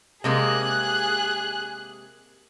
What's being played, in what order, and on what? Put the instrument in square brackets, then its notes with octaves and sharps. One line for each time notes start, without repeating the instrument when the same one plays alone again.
[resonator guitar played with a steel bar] C3 G#3 A#3 [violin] G#4 F#6